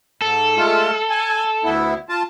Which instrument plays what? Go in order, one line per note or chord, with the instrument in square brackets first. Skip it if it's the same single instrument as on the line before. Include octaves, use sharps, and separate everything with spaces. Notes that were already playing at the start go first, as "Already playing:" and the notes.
[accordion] G#2 [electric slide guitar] A4
[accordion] G#3 A3 F4
G#5
D2 B3 E4
F4 A5